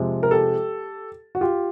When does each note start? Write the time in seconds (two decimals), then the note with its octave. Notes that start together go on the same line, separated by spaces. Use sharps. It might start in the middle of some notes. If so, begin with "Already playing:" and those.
Already playing: C3 F3 G#3
0.23 A#4
0.31 G4 A4
1.35 F#4
1.41 F4 G4